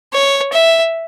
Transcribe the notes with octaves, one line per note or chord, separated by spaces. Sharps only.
C#5
E5